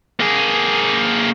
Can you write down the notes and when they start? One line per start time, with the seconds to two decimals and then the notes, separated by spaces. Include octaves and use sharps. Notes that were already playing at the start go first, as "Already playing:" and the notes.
0.20 A#3 G#4